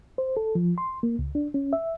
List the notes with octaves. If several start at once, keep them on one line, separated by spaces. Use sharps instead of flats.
C5
A4
F3
C6
A#3
C#2
D4
C#4
E5